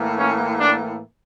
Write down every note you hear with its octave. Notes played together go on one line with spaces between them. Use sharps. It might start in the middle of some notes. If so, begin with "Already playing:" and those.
Already playing: A2 E3 A#3
C#4
D4